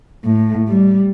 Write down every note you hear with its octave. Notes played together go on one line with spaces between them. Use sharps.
A2
G3